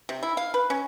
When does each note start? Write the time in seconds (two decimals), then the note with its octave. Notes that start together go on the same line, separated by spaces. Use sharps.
0.09 C3
0.23 E4
0.37 F5
0.54 B4
0.70 C#4